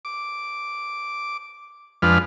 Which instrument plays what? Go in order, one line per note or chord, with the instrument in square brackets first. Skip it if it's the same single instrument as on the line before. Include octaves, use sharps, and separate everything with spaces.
[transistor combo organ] D6
F2 F3 G#3 D4 B4 F6